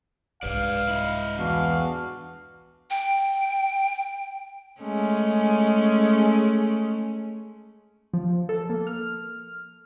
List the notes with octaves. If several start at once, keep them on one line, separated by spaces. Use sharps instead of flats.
C2 G#2 B4 D5 F5
E4 D#5
E2 B3 D4 F#4 F5
G5
G#3 A3 C#4
F3
A4
A#3
F6